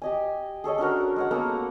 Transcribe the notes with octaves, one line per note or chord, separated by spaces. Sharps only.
G4 D#5 G#5
G#4 A4 C#5 D#5
C#4 D4 F#4 A#4
G#3 C#5 F#5
A#3 B3 A4 A#5